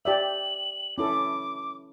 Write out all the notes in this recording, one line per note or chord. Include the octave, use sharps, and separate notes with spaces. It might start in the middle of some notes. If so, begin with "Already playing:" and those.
G4 D5 E5 F#7
C#4 E4 A4 D6